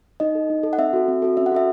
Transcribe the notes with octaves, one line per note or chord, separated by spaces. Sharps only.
D#4 D#5
A4
D#4
A4
F#5
C4 E5
F#4 A4
C4
F#4 A4
C#4 E5
F#5
F#4 A4 E5